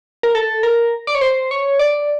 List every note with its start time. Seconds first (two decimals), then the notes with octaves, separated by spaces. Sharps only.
0.23 A#4
0.35 A4
0.63 A#4
1.07 D5
1.15 C#5
1.21 C5
1.51 C#5
1.79 D5